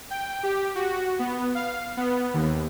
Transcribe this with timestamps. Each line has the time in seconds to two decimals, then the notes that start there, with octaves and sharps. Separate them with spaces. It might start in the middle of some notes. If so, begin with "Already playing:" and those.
0.10 G5
0.43 G4
0.75 F#4
1.19 B3
1.55 F5
1.97 B3
2.34 D#2